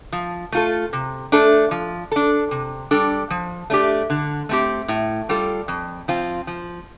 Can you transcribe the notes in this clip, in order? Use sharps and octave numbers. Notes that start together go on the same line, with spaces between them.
F3
A3 F4 A4
C3
A3 D4 A4
F3
D4 A4
C3
G3 D4 A4
F3
A3 D4 G4
D3
A3 C4 G4
A2
G3 F4 A4
F2
F3 C4 F4
F3